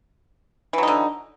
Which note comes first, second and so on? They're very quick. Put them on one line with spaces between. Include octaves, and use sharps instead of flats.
E3 F#3 D#4 D3